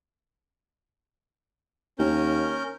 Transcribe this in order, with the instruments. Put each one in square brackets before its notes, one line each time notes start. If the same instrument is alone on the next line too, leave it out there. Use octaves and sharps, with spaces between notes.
[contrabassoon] D#2 [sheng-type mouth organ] C#4 A#4 G6